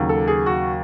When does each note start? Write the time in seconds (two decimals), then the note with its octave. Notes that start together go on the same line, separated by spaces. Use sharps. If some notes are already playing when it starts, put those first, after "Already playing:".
Already playing: D#2 C#3 F#3
0.09 A4
0.28 G#4
0.46 F#4